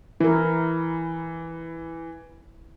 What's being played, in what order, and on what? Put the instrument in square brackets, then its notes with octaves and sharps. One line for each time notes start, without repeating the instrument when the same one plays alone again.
[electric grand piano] E3 [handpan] E4 A#4